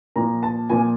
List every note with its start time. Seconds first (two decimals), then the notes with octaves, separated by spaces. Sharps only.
0.16 A#2 F3 A#5
0.43 A5
0.70 A#2 F3 G#5